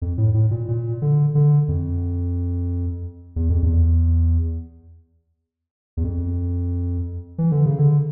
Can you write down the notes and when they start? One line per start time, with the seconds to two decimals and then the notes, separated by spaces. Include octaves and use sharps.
0.02 F2
0.18 A2
0.34 A2
0.51 A#2
0.68 A#2
1.02 D3
1.35 D3
1.68 F2
3.36 E2
3.50 F2
3.63 E2
5.97 E2
6.04 F2
7.38 E3
7.52 D3
7.66 C#3
7.79 D3